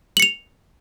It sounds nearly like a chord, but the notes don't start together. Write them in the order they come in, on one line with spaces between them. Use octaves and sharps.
F#7 C#7 F7